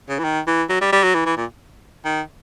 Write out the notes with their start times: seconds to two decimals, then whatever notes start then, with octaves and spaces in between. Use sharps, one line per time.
0.09 C#3
0.19 E3
0.24 D#3
0.47 E3
0.69 F#3
0.81 G3
0.92 G3
1.03 F#3
1.14 E3
1.26 E3
1.37 A#2
2.05 D#3